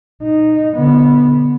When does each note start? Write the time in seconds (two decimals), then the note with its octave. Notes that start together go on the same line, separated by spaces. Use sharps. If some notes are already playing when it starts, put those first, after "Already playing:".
0.22 D#4
0.76 D3 B3